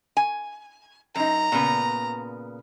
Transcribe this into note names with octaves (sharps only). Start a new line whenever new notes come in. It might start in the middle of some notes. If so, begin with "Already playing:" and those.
G#5
F#2 D#4 A#5
A#2 C#3 B3